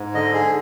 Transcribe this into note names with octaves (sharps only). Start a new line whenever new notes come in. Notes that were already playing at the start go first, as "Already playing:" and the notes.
Already playing: G#2
D3 D#5
G#4